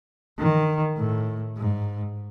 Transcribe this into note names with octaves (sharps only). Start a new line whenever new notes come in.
D#3
A2
G#2